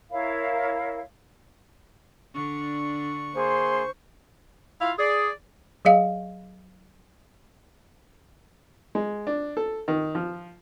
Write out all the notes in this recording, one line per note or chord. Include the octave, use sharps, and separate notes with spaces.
E4 A#4 C#5 F5
D3 D4 C#6
A#3 G#4 C5 C6
E4 F4 F5
G#4 D5
F#3 G#4 D#5 F5
G#3
D4
A4
D#3
F3